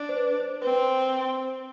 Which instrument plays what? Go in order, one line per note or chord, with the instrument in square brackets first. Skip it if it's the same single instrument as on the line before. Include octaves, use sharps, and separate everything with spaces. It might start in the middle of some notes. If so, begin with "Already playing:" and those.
Already playing: [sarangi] D4
[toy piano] C5
B4
C5
[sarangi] C4 [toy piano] B4